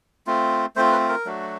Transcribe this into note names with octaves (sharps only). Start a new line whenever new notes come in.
A3 C4 F4
A3 C4 F4 C5
B4
A#4
F#3 A3 D4 F#4